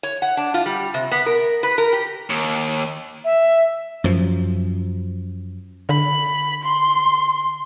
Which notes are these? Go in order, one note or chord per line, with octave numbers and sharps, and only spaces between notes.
C#5
F#5
D4
F4
G3
C3
B3
A#4
B4
A#4
G4
D#2
E5
F#2 F3
D3 B5
C6